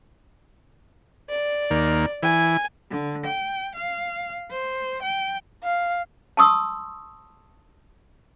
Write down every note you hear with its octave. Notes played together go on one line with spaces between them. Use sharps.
D5
D#2 A#3
E3 G#5
D3
G5
F5
C5
G5
F5
A5 C6 C#6 D#6 E6